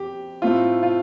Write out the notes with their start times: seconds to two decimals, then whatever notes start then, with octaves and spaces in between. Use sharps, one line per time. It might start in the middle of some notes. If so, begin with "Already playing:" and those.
Already playing: F2 G4
0.42 A2 A3 C4 F4
0.83 F4